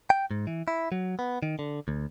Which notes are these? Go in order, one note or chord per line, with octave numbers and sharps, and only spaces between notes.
G5
G#2
E3
E4
F#3
B3
D#3
D3
D2